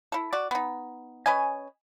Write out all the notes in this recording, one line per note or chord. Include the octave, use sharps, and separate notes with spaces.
E4 A4
F#4 D5
B3 D#4
C#4 B4 D#5 G#5